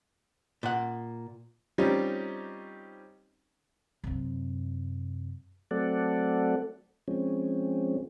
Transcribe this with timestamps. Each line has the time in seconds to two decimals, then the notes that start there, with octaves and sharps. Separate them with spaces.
0.63 A#2 F#5
1.78 G3 C4 C#4 D#4 F4 G4
4.04 F#2 C3
5.71 F#3 A3 C4 A4 D5 F#5
7.08 F3 G#3 C4 C#4